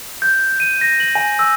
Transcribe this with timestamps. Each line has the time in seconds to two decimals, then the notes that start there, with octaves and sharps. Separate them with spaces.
0.22 G6
0.60 D#7
0.81 A#6
1.00 F#7
1.15 G#5
1.39 E6